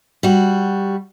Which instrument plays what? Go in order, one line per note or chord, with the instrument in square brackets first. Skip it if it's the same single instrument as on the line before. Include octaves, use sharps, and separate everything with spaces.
[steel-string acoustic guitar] G3 F#4